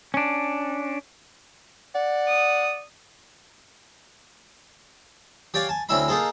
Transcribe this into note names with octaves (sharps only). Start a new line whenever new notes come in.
C#4 D4
D5 F#5
D#6
G4 C#5 D5 F5 G#5
G#5 A5
D2 C4 C#4 E4 E5 B5
A#3 D#4 F4 G#4 A4